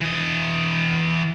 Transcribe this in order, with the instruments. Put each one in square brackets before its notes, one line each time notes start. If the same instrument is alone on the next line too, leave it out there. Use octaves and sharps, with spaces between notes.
[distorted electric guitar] E3 D#5